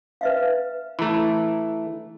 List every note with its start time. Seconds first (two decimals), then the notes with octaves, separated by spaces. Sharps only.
0.21 B4 E5 F5
0.99 E3 A3 A#5 B5